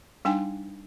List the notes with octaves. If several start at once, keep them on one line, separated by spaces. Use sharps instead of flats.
G3 D4 D#4 G5 G#5